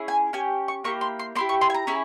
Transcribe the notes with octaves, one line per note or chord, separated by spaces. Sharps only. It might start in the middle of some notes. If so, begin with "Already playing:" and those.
Already playing: C#4 E4 G#4
G#5
C#4 G4 G#5
C#6
A#3 E4 G4 C#6
C6
C6
A#3 E4 G4 C6
C#6
C6
G#5
A#5
C#4 E4 G#4